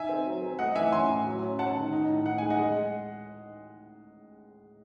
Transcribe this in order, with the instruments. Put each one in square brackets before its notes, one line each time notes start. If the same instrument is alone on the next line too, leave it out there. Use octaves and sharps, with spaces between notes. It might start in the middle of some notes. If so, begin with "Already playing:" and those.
Already playing: [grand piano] D#4 E5 G#5
C4
F#3
C4
A3 D#5 F#5
E3 E5 G#5
C#4 G#5 C6
A2
F#3
C#4
C#4 F#5 A5
D#3
D#4
A2
D#4 F#5
G#3 G#5
D#5 F#5
G#3